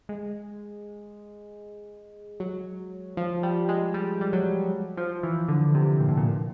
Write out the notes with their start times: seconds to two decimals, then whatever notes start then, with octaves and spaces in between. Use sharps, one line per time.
0.09 G#3
2.40 F#3
3.17 F3
3.43 G3
3.69 G#3
3.94 G3
4.21 G3
4.33 F#3
4.97 F3
5.23 E3
5.48 D3
5.74 C3
6.00 A#2
6.08 A2
6.17 A#2